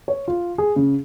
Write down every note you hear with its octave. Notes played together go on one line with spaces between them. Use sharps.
C#5
F4
G#4
C#3